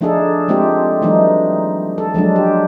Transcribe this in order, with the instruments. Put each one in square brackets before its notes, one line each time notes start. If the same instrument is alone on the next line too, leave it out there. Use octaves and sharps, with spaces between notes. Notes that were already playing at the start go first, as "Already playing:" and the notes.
[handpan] F3 A3 D4 D#4 G#4 A4
G#3 A3 C4 F4 G4
E3 F#3 G#3 A3 D4 D#4
A4
F3 F#3 G#3 D4
G4